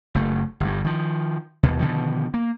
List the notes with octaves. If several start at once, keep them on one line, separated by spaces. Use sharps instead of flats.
F#1 A3
G1 G2
D#3 F3
D#2 B2
B2 D3 D#3 F3
A#3